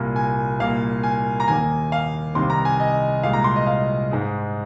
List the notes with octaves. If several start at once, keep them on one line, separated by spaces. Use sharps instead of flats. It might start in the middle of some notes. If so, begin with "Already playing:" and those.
Already playing: C2 A#2 A#3
G#5
C2 A#2 A#3 F5
G#5
A#5
D#2 D#3 A#3 G#5
F5
C2 C3 D#3 C6
A#5
G#5
D#5
C2 A#2 G#3 F5
A#5
C6
D#5
F5
G#2 G#3